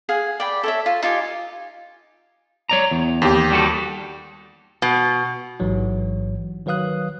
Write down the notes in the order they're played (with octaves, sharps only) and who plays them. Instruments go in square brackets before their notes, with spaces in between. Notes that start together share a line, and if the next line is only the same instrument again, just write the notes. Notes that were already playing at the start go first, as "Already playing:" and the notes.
[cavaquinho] G#4 F5 F#5 G#5
D5 G5 B5
A4 C#5 E5
F4
D#4 F4 G4 G#5
[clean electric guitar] C#5 D5 A#5
E2
[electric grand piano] D#2 G4
[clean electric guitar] G3 F#4 A4
[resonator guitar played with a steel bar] B2
[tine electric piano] A1 G#2 E3 F#3
D#3 F#3 B4 F5 D#6 F#6